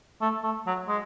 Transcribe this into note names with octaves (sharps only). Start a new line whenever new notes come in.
A3
A3
F#3
G#3